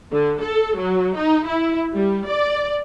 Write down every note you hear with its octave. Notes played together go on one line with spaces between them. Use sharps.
D3
A4
F#3
D#4
E4
G3
D5